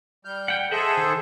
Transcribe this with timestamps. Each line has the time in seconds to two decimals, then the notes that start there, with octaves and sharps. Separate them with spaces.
0.25 G3 F6 G6
0.48 F#5 G5
0.71 G#4 A4 C5 D#5 E5 F#5
0.97 D#3